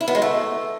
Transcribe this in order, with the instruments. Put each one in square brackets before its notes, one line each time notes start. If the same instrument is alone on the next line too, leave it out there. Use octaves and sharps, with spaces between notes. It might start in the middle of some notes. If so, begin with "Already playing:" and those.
[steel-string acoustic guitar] E4
B3
G#3
A3